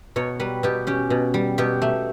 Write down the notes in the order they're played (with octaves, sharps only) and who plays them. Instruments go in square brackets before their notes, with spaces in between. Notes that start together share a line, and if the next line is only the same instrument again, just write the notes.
[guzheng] B2 C#5
G3 B4
B2 G4
C#4 G4
B2
G3
B2 G4
A3